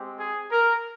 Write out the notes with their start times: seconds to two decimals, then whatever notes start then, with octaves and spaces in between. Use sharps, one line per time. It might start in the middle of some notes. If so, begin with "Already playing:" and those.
Already playing: G#3 C4 G4
0.16 G#4
0.51 A#4